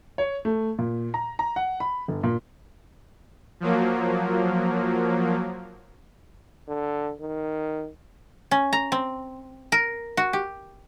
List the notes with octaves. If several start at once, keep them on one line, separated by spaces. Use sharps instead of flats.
C#5
A3
A#2
A#5
A#5
F#5
B5
G1
A#2
F3 F#3 A#3
D3
D#3
C#4
A#5
C4
A#4
F#4
G4